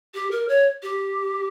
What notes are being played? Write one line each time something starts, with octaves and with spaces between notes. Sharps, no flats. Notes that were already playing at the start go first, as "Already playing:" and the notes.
G4
A#4
C#5
G4